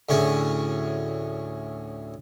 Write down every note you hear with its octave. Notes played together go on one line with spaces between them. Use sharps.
D2 A2 C#4 G#4